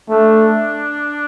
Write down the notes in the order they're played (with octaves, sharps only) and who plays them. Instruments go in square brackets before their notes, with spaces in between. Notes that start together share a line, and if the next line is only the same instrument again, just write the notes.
[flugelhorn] A3 [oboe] D4